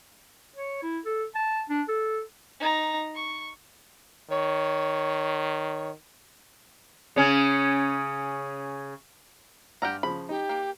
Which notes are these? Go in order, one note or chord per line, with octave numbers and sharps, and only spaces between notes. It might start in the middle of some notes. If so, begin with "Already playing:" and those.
C#5
E4
A4
A5
D4
A4
D#4 A#5
C#6
D#3 C#5
C#3 C#4
G2 G4 D5 F#5 A#5 F6
C#3 F3 B5
D#4 G4
A#3